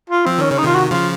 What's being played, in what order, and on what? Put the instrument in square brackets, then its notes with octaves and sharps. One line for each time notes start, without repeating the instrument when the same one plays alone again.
[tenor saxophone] F4
[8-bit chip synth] F3 [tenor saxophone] C4
[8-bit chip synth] D#3 [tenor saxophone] C#4
[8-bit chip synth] C#3 [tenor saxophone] C#4
[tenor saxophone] D#4
[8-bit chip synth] C3 D#3 [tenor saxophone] F4
[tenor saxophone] F#4
[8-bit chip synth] C#3 F3 [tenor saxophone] F4